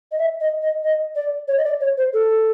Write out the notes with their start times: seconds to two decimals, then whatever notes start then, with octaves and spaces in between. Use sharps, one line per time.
0.11 D#5
0.18 E5
0.40 D#5
0.62 D#5
0.83 D#5
1.15 D5
1.47 C#5
1.57 D#5
1.64 D5
1.80 C#5
1.97 C5
2.13 A4